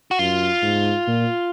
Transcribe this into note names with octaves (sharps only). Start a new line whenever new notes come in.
F#4
F#2 F4
G#2
A#2